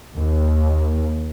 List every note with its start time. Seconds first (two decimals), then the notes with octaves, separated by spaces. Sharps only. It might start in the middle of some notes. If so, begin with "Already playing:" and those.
0.15 D#2